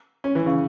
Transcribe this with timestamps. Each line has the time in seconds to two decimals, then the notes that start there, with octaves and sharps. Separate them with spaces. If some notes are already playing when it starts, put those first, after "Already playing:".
0.24 C#4
0.35 E3
0.46 C#3